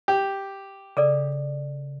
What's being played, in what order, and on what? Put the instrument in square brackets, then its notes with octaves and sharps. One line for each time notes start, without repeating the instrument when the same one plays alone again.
[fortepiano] G4
[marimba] C#3 [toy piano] G#4 A4 D5